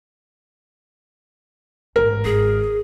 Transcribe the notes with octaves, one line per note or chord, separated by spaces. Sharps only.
A1 G#2 A#4
G#1 G#4